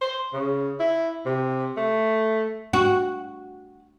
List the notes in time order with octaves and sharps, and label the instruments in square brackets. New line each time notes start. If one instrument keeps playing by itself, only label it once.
[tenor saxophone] C5
C#3
E4
C3
A3
[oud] F#4